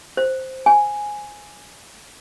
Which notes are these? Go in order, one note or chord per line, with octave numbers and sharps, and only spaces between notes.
C5
G#5